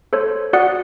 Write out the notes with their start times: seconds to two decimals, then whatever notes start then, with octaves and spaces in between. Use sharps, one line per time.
0.13 A4 C5 C#5
0.53 F#4 D5 F#5 D#6 F#6 C#7